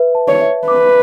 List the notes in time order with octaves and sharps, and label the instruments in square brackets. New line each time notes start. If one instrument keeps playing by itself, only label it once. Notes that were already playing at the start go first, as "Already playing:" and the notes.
Already playing: [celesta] B4 E5
A5
[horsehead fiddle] C#5
[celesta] E5
[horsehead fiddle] B4 [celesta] D6